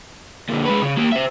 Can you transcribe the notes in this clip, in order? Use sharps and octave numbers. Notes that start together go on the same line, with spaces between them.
A#2 D3
G#3 B4
C#3
A#3 G4
C5 E5